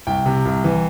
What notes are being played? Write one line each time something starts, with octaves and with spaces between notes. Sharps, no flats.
C2 G5
C3
C2
E3